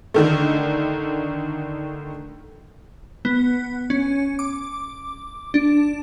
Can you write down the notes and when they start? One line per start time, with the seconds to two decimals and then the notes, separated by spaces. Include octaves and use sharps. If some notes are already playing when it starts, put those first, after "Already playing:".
0.14 D3 D#3 A3
3.25 B3
3.90 C#4
4.39 D6
5.54 D4